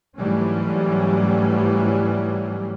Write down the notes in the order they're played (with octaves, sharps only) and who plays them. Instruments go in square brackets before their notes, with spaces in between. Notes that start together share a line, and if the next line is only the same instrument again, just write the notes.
[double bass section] G#2 E3 F#3 G3 A3 C#4